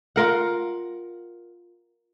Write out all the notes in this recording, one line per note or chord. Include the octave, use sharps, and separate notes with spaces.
F4 A#4 F#5